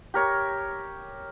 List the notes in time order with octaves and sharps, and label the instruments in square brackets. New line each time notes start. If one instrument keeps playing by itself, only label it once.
[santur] G4 A#4 C#5